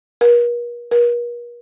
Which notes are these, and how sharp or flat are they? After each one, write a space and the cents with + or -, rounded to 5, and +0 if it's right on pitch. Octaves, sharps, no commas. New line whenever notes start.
A#4 +45
A#4 +45